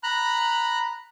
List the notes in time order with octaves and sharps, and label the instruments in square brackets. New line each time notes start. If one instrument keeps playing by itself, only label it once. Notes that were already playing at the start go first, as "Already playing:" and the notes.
[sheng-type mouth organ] A#5 B5 F#6